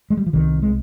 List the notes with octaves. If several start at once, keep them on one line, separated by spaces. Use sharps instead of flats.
G#3
G3
F3
C2 C3 D#3
G#3